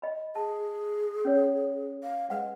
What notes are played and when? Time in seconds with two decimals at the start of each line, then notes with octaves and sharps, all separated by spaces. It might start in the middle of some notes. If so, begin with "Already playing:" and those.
0.02 D#5 B5
0.35 G#4 A5
1.25 C#4 A#4 C#5
2.03 F5
2.30 G#3 B4 F#5